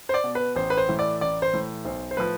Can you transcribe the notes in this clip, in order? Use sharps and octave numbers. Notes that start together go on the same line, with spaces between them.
C5
D5
B2
B4
A1 C5
B4
C5
A2 E3
D5
A1 D5
C5
A2 E3
B1 C5
C5
A2 F3 B4